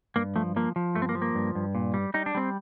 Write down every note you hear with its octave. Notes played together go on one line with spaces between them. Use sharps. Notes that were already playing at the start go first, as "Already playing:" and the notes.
G2 A#3
F3 A3
F3 A#3
F3
G2 A3
C4
A#3
F3
A#3
G2
G2
A#2
G3
G3 D#4
D4
G3 C4